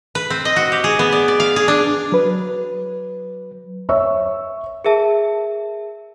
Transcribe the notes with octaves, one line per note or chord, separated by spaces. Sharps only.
B4
C4
D#5
F#4
G4
G#4
B3
D5
D5
F5
G#4
D4
F#3 B4
C#5 E5 C#6 E6
G#4 A#4 E5 A5